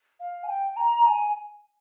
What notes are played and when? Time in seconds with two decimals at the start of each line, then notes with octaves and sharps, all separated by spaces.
0.20 F5
0.44 G#5
0.48 G5
0.77 A#5
1.06 G#5